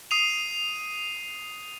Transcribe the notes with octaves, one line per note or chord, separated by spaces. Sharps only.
D#6 C7 D#7 F7